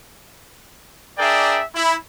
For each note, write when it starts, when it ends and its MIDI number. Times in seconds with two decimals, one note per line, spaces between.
1.19 1.61 62
1.19 1.61 68
1.19 1.61 70
1.19 1.61 74
1.19 1.61 76
1.19 1.61 79
1.75 1.94 64
1.75 1.94 83